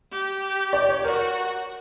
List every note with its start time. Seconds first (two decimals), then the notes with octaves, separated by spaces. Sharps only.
0.11 G4
0.73 D5
0.89 C#5
1.04 F#4 A#4